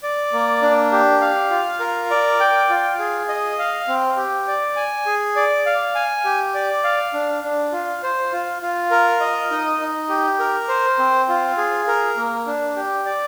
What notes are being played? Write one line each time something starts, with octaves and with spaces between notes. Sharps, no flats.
D5
A#3
D4
G4
F5
F4
A#4
D5
G5
F4
G#4
D#5
F5
C4
G4
D5
G#5
G#4
D5
F5
G#5
G4
D5
F5
D4
D4
F4
C5
F4
F4
A#4
D#5
D#4
D#4
G4
A#4
C5
C4
F4
G#4
A#4
A#3
D4
G4
D5